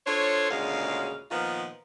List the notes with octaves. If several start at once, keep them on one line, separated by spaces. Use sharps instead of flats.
D4 F4 A4 C5 C#5
D2 A#2 C#3 G#3 F#4 F5
A#2 D#3 F3 B3 F4